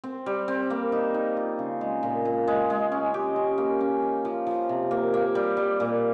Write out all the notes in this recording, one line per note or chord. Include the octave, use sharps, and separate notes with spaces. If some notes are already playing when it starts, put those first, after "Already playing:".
C4
G3
C4
A#3
D#4
D#4
F4
C#3
G#3
A#2
A#2
G#3
G#3
C#4
G4
C#4
A#3
C#4
D#4
F3
F3
C3
A#3
A#3
G3
G3
A#2